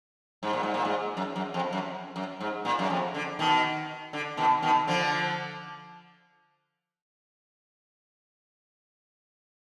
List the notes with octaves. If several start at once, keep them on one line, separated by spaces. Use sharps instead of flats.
G#2
A#2
G#2
A#2
G#2
F#2
F#2
F2
F#2
F#2
G#2
A#2
F#2
F2
D3
B2 D#3
D3
B2 D#3
B2 D#3
D3 F3